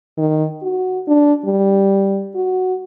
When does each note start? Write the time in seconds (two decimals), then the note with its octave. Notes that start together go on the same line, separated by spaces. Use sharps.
0.18 D#3
0.63 F#4
1.08 D4
1.45 G3
2.35 F#4